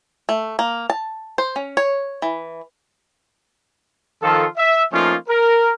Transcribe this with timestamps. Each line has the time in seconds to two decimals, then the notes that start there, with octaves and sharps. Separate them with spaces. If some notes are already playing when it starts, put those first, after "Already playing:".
0.29 A3
0.59 A#3
0.90 A5
1.38 C5
1.56 C#4
1.77 C#5
2.22 E3
4.22 D#3 F3 F4 A4
4.58 E5
4.93 F3 A3 A#3 C#4 D#4 F4
5.28 A#4